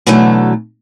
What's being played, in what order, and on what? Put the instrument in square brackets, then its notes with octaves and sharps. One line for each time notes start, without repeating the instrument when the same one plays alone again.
[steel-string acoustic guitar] B2 D3 E3 F#3 A3